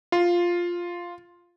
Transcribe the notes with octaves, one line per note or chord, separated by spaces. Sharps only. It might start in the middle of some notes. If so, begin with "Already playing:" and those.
F4 C6